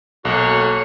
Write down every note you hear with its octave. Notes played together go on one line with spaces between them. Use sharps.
B1 A#3 F#4 A4 C#5 C#6 F#6